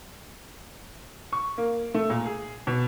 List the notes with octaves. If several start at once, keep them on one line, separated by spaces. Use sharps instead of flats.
C#6
A#3
A3
A#2
G#4
B2